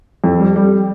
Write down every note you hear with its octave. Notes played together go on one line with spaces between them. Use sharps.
F2
G3
G3